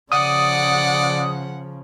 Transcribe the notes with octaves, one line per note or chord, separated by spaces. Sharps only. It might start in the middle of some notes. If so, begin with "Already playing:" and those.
C#3 F3 D5 F#5 D#6